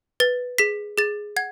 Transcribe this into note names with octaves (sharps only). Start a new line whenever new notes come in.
B4 A6
G#4 B6
G#4 A6
F#5 G#6